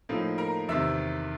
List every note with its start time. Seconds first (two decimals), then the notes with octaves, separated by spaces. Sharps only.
0.09 A2 F3 A#3 D#4
0.38 A#4 A#5
0.68 E2 C3 D#3 E5 E6